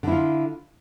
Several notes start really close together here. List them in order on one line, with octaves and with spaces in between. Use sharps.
D3 E4 F4